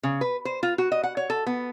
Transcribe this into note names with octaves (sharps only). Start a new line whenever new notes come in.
C#3
B4
C5
F4
F#4
D#5
F#5
C#5
A4
B3